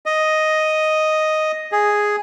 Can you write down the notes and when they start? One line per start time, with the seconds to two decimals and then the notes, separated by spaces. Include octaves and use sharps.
0.06 D#5
1.72 G#4